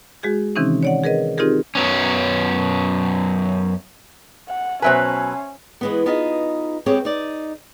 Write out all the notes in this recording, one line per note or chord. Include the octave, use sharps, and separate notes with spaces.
G#3 F#4 G#4 G6
C3 D#3 E3 C4 C#4 D#4
C#5 D5 F#5
G#4 A#4 B4 D#5
C4 D#4 F4 G4 G#4 A#4
F#2 F#3 B3 C#4
F#5
B2 F#3 C#4 B4 C5 E5 G#5
E3 G#3 B3
B3 D#4 F4 G#4 D#5
G#3 B3 C4 G4 G#4 C#5
D#4 D5